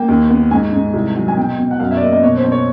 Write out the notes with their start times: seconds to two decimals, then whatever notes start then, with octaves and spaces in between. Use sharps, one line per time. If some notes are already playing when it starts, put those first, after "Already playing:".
Already playing: A#3 G5
0.08 D#2
0.30 B3
0.51 G#2 G#5
0.72 G#2
0.93 C2
1.15 F#3
1.28 G#5
1.37 B2 G5
1.58 B2
1.71 F#5
1.80 F#2 F5
1.91 E5
1.97 D5
2.01 A#3 D#5
2.12 D#5
2.23 B2 C#5
2.37 C5
2.44 B2
2.52 C#5